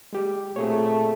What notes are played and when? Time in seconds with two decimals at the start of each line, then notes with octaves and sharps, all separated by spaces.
0.13 G#3 G4
0.56 A#2 A3 C4 G#4 C#5